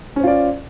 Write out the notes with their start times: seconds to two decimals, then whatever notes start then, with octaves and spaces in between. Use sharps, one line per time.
0.16 C#4
0.20 C5
0.24 F4
0.27 D5